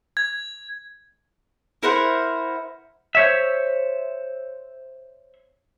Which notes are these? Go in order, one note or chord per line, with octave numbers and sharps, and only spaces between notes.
G#6
E4 A#4 C5 F#5
C5 C#5 E5